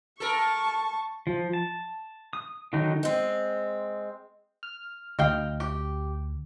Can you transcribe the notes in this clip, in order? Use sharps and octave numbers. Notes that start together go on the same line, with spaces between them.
A4 A#4 A5 C#6
F3
A5
D#6
D3 D#3 F#3 D#4
G#3 C4
F6
D2 D#5 F5 G5
G4